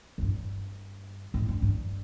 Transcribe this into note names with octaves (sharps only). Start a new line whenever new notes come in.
G#2
G2
G#2
G2
G2